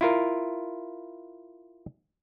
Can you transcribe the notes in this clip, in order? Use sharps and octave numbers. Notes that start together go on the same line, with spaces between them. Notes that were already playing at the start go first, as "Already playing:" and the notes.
E4 F4 A#4